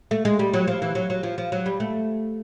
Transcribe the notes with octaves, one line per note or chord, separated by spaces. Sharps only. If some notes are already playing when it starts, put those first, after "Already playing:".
A3
G#3
G3
F#3
F3
E3
F#3
F#3
F3
F3
F#3
G3
A3